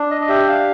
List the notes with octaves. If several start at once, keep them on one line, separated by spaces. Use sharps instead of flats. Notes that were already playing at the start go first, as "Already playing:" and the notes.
Already playing: D4
D#5
D#5
G4 E5
F5